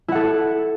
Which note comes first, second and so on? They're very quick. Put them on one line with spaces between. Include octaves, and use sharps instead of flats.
E4 F#5 A4